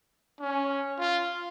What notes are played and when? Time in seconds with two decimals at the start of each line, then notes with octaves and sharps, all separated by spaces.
0.40 C#4
0.99 F4